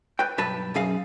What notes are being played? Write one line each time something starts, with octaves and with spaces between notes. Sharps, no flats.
B4 G5
B1 G2 B4 A5
B1 F#2 G#4 F5